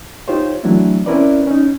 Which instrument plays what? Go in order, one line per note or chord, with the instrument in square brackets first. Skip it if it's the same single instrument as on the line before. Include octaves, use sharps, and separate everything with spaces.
[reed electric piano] D#4 F4 G4 C5 C#5
E3 F#3 A3 C4 D4 E4
C4 C#4 E4 A#4 B4 D5
C#4 D#4